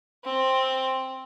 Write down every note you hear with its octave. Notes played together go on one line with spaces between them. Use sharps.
C4